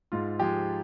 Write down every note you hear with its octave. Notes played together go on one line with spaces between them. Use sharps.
G#2 F4
F3 G#3 G4